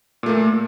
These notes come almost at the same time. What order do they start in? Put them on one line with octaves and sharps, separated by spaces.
A#2 A3 A#3